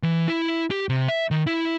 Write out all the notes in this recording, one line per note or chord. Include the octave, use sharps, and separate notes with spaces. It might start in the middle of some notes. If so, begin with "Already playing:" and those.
E3
E4
G4
C3
E5
D#3
E4